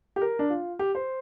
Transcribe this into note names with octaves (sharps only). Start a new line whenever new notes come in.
G4
A#4
D4
F4
G4
C5